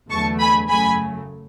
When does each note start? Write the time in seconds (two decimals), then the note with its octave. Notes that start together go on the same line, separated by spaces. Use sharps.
0.10 E2 D3 F#3 A3 A5 C#6
0.40 G#5 B5
0.69 F#2 C#3 F#3 A3 G#5 B5